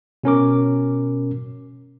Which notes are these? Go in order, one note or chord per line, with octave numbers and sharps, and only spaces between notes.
B2 C#4 A#4 D6